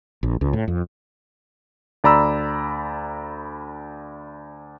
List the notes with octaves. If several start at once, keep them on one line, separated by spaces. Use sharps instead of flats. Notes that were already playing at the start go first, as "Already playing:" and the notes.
A#1
C#2
A2
F2
D2 D5 A#5 B5 E6